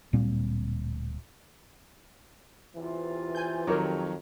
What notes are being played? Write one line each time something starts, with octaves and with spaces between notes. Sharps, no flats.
D1 A#2 G3 C4
E2 C3 E3 F4
G#5 G6
F2 D#3 F#3 G4 A#4 C#5